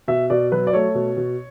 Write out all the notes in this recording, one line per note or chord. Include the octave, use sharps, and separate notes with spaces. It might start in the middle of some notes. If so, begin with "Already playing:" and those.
B2 E5
B2 D5
F#3 B4
D5
A3 C#5
B2
B2